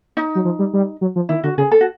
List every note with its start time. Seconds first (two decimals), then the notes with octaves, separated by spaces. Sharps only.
0.17 D#4
0.35 F#3
0.45 F3
0.59 G3
0.73 G3
1.01 F#3
1.16 F3
1.29 D#3 E4
1.44 D3 F#4
1.58 C#3 G#4
1.72 A4
1.81 F#4